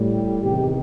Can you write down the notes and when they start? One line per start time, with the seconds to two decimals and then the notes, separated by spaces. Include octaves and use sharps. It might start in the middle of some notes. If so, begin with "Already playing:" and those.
Already playing: A2 G3
0.14 G4
0.43 E2 C3 D#3 G4